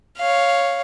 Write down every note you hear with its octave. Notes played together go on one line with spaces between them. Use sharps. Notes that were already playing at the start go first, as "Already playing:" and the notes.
C#5 F5